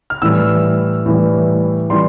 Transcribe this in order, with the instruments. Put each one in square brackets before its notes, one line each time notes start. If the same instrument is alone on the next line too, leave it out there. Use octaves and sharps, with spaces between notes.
[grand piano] F6
A2 E3 G3 E6
A2 E3 G3
E3 G3 C6